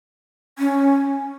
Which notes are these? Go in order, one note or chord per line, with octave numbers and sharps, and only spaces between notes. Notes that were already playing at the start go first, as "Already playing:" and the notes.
C#4